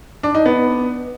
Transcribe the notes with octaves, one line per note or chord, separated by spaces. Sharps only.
D4
D#4
B3